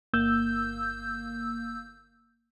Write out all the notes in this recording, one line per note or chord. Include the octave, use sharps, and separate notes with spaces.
G1 A#3 E6 G6